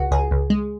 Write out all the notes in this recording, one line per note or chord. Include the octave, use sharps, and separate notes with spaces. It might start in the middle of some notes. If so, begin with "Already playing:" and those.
Already playing: C#2 F#4
C#2 G#4
C#2
G#3